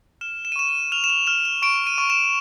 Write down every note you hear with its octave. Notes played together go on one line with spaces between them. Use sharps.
F6 E7
E7
D#7
C#6 E7
D#7
F6 F7
E7
F7
F6 E7
E7
C#6 D7
D#7
C#6
E7